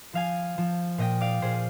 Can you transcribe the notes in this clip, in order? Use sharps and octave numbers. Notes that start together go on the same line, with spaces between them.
F3 F5 G#5
F3
A#2 D#5 G5
D5 F5
A#2 G#4 C5